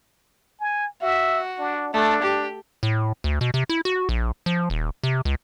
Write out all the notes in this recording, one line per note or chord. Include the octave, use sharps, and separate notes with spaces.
G#5
F#4 E5
D4
A3 D4
G4
A2
D2
B2
C3
E4
F#4
A#1
F3
D#1
C3
C#2